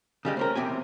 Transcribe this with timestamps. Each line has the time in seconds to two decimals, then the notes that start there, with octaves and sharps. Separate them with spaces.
0.25 C#3 G3 G#3
0.37 C4 C#4 A#4
0.55 E2 C3 C4 G5 G#5